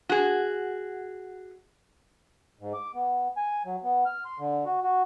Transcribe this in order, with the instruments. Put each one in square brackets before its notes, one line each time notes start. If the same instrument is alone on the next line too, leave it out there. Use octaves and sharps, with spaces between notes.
[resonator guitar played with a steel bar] F#4 G#4
[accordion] G#2
D6
B3
G#5
F#3
B3
F6
C6
D3
F#4
F#4